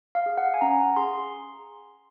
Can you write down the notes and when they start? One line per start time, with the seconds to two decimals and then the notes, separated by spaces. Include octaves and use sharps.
0.15 F5
0.26 G#4
0.38 F#5
0.54 G#5
0.61 C#4 A#5
0.96 G#4 C6